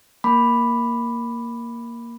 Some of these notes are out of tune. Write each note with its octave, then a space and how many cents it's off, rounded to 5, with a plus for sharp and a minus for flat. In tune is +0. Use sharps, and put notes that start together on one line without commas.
A#3 +0 B5 +0 D6 +0